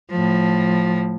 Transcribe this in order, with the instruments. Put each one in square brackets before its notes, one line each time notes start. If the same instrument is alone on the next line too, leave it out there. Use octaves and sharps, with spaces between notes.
[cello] A2 F3